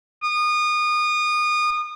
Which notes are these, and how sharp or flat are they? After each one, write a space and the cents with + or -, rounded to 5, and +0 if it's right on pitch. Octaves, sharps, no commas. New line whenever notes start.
D#6 -30